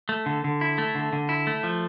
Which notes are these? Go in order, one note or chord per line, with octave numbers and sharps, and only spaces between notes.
A3
D3
D3
E4
A3
D3
D3
E4
A3
F3